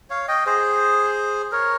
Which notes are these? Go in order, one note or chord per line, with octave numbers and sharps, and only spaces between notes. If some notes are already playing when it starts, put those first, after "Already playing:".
C#5 F5
D#5 G5
G#4 C5
A#4 C#5